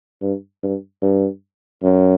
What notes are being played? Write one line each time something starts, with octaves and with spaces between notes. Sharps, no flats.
G2
G2
G2
F#2